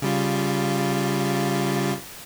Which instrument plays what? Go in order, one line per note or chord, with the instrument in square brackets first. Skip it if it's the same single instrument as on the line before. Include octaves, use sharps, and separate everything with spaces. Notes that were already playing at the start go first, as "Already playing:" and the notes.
[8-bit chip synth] C#3 G3 F4